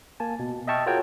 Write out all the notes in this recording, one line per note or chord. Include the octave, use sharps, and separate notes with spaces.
A#3 G#5 A5
B2
D#5 E5 G5 A5 C#6 F6
F4 F#4 G#4 A#4 C#5 G5